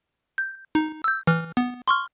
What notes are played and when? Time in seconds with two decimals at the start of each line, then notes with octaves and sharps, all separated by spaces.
0.38 G6
0.75 D#4
1.04 E6 G6
1.27 E3 F6
1.57 B3
1.88 C6 C#6 F6